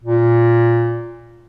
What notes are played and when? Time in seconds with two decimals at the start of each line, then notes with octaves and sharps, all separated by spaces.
0.03 A#2